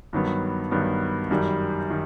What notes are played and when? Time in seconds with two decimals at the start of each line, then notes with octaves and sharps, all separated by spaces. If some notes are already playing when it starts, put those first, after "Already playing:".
0.13 G2 D#3 F#3 B3
0.71 G2 D#3 F#3 B3
1.31 F#2 D#3 G3
1.91 D#3